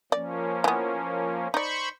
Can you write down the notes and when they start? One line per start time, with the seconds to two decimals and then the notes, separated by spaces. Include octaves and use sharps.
0.12 F3 A#3 C#4 D5
0.64 E3 B3
1.54 D#4 C5 D5 B5 C#6